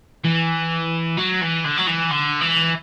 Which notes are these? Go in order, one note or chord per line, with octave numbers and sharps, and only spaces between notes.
E3
F#3
E3
D3
F#3
E3
D3
E3